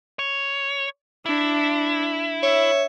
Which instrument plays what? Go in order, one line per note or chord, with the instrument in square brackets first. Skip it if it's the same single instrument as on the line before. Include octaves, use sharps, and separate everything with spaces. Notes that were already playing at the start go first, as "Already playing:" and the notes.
[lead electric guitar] C#5
[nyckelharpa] D4 [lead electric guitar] E4
[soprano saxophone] C#5 [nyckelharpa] E5